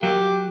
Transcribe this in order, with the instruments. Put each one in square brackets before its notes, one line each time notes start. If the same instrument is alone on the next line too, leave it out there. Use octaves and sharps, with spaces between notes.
[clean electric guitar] F#3 [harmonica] A#3 G4